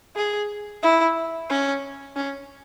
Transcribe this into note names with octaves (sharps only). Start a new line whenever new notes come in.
G#4
E4
C#4
C#4